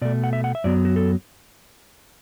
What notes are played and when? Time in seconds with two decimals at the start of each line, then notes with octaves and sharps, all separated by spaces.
0.01 B2 A3 D5
0.24 F#5
0.33 E5
0.44 F#5
0.55 E5
0.64 F#2 F#3 B3 D5
0.85 F#4
0.96 A4